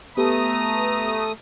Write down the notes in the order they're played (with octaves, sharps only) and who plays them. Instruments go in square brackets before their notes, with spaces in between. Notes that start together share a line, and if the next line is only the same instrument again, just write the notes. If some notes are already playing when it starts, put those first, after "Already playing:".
[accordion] A3 D#6 [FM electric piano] B3 G4 B4 [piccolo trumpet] A#5